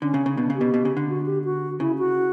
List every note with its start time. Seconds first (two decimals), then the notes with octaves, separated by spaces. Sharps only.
0.02 D3 C#4
0.14 C#3
0.26 C#3
0.37 B2 D4
0.50 C#3
0.55 G4
0.61 B2
0.74 B2
0.85 C#3
0.97 D3
1.09 F#4
1.26 G4
1.44 F#4
1.80 C#3 E4
1.98 F#4